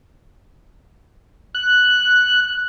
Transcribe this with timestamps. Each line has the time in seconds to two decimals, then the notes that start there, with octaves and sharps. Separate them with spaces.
1.55 F#6